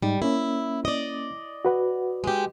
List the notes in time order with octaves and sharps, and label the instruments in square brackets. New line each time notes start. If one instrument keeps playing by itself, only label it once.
[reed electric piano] G#2 D#4 [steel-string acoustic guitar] G3
[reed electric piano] A#3 C#4 [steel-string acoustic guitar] E4
[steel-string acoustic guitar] D5 D#5
[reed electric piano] F#4 B4 F#5
[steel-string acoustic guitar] G#3 G4